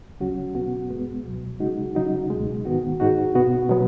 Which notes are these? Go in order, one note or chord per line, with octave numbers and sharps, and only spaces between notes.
C#2 C#3 F#3 C#4 F#4
B2 B3 F#4
G#2 G#3 B3
C#2 B2 F#3
C#3 G#3 D#4 F#4
C#3 F#3 D#4 F#4
C#2 B2 G#3
G#2 D#3 B3 F#4
G#2 G#3 D#4 F#4
B2 B3 F#4
B2 F#3 B3